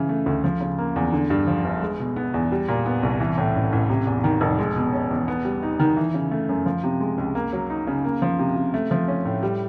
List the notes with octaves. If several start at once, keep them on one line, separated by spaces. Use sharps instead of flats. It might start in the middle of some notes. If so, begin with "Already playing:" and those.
Already playing: C#3 E3
A3
D2
F3
C#3
A#3
E2
D3
G2
F3
G1
G#3
B2
B3
E2
G3
A#2
B3
C2
E3
A2
A1
A1
C3
E2
D#3
F1
G#3
B2
C#4
E2
B3
G3
D#4
D#3
E3
C#3
A3
F#2
F3
C3
G#3
C#2
A#3
F#3
D#4
C#3
A#3
F3
C3
C3
A3
F3
C#4
A2
G3